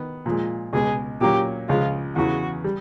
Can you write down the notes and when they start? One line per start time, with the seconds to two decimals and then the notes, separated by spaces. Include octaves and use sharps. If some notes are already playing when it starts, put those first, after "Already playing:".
Already playing: D#3 B3
0.26 A#2 F3 G#3
0.73 C#2 B2 G#3 G#4
1.21 A#2 F#3 A#3 C#4 G4
1.69 C#2 C#3 F3 G#3 F4
2.16 E2 C#3 E3 F#4
2.64 G3